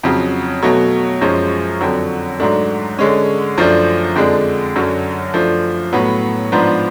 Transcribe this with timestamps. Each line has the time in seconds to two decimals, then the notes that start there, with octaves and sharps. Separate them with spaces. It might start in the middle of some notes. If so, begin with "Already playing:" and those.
0.03 F2 C#3 F#3
0.62 B2 F#3 A3
1.21 F#2 F3 G#3 C#4
1.81 F2 D3 F#3
2.40 G#2 F#3 A3 D4
2.99 D3 G#3 C#4
3.58 F#2 F3 A3 D4
4.16 F2 D3 G#3 D4
4.75 F#2 D3 F#3 C#4
5.34 F#2 F3 A3 D4
5.93 A2 F#3 B3
6.52 G#2 F3 B3 D4